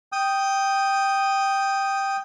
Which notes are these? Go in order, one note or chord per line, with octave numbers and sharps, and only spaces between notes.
G5 D#6